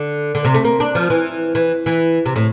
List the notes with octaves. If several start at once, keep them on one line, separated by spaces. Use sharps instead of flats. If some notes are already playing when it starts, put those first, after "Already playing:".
Already playing: D3
D3
C3
A3
A#3
D4
F3
E3
E3
E3
C3
A2